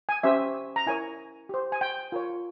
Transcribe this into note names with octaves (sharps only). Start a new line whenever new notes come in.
G#5
C#4 G4 C5 E5
A#5
E4 A#4 C#5 G#5
G4 C5
G#5
G5
F4 A#4 C#5